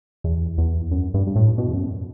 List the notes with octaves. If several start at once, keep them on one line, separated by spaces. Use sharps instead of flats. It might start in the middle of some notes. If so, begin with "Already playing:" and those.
E2
E2
F#2
G2
G2
A2
B2
E2
F#2